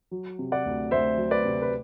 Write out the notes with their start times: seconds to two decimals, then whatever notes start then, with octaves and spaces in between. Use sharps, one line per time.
0.11 F#3
0.39 C3
0.52 D5 F#5
0.65 D2
0.91 D2 C5 E5
1.18 F#3
1.31 B4 D5
1.45 C3
1.62 B4